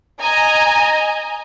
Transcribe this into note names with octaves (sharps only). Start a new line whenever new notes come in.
D#5 G#5 A#5